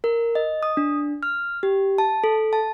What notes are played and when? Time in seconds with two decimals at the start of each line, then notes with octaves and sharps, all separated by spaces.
0.04 A#4
0.35 D#5
0.63 D#6
0.77 D4
1.23 F6
1.63 G4
1.98 A5
2.24 A4
2.53 A5